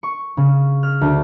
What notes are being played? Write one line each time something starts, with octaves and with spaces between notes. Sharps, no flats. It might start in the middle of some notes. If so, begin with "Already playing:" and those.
C#6
C#3
F6
D2